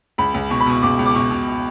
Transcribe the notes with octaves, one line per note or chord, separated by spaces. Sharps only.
C#2 B5
C#2
B2 C#6
B5
B2 C#6
C#2 D6
C#2
D6
B2 C#6
B2